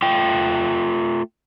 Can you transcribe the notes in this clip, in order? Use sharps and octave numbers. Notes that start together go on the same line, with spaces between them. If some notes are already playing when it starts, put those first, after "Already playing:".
A3 F4 G5